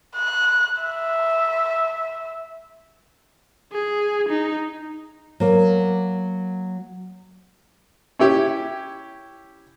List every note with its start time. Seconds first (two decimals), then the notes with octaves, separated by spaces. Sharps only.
0.16 F#6
0.82 E5
3.73 G#4
4.29 D#4
5.40 F#3 A#3
8.19 C#4 E4 G4